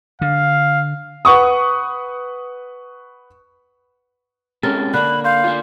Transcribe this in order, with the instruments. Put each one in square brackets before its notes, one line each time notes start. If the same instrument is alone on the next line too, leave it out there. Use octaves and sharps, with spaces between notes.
[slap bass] D3 [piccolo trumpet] F5
[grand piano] B4 F#5 C#6 D#6
[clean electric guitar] C3 G#3 C#4 [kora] A4 A#4 [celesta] A6
[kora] D3 [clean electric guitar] A#3 [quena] B5 [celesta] F#6
[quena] F5 [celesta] C6 G6
[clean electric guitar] A#3 F4